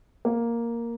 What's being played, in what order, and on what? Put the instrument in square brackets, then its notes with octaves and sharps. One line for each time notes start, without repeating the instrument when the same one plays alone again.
[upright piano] A#3